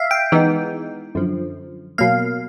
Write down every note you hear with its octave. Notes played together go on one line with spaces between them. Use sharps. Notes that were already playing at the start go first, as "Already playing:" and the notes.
Already playing: E5 F5
G5
E3 G#3 B3 D#4
F#2 D3 F3
B2 F#3 A#3 F5